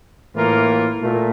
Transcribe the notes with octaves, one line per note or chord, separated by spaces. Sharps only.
A2 E3 A#3 F4 A#4
A#2 A3